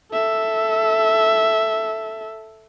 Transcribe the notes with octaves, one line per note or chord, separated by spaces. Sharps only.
A4 E5